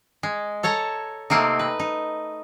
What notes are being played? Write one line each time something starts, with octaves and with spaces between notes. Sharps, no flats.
G#3
A4 C#5 A5 A#5
C3 A3 A#3 C4 D#4
B4
D#4